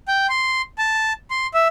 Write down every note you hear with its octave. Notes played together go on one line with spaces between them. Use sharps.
G5
C6
A5
C6
E5